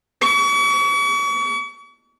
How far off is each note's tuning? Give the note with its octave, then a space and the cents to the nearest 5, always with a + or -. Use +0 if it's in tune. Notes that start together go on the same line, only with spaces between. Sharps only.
C#6 +40